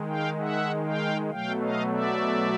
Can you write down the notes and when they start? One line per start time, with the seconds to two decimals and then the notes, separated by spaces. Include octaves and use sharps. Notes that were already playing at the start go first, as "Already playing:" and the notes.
Already playing: D#3 G#3
0.08 F5 G5
0.39 E5 F#5
0.85 F5 G5
1.30 B2 F#3 A3 F5 G5
1.62 D#5 F5
1.92 D5 E5